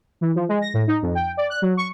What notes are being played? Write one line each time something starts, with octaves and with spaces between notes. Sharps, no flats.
E3
F3
G#3
A#6
A2
D#4
F2
G5
D5
F#6
F#3
C#6